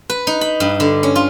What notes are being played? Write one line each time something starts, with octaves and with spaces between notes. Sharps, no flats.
B4
D#4
B5
G2
D3
C#4
F4